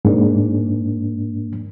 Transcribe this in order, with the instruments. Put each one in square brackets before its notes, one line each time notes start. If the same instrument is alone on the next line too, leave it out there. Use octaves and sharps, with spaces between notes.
[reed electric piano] G#2 A#3 D4